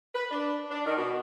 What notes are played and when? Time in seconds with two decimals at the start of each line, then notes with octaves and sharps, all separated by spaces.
0.15 B4
0.31 D4
0.71 D4
0.85 D#3
0.97 B2